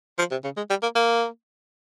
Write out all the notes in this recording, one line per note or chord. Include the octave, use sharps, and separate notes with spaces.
F3
C3
C#3
G#3
G3
A#3
A#3